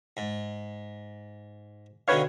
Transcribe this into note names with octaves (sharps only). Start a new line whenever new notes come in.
G#2
B2 D3 D#3 B4 C#5 F5